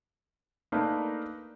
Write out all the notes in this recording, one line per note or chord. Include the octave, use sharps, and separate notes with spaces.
A3 A#3 D4 D#4 A#4 B4